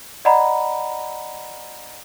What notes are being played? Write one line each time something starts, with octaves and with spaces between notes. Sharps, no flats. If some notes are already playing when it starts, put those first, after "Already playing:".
D5 D#5 F#5 A#5 B5